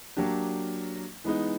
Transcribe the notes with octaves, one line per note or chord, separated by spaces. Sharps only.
F#3 A#3 D4 G4
E3 G#3 B3 D#4